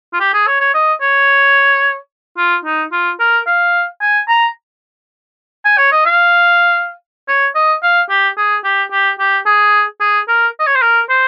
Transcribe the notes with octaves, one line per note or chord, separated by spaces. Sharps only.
F4
G4
G#4
C#5
C#5
D#5
C#5
F4
D#4
F4
A#4
F5
G#5
A#5
G#5
C#5
D#5
F5
C#5
D#5
F5
G4
G#4
G4
G4
G4
G#4
G#4
A#4
D#5
C#5
C5
A#4
C5